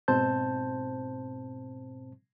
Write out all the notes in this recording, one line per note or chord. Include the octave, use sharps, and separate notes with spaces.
G#2 B2 C4 C5 A5 G6